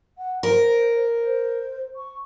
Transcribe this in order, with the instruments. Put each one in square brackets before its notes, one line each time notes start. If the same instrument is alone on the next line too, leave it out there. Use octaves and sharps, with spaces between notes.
[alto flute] F#5
[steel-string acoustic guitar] A#4 [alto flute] C5
[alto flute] C5
C#6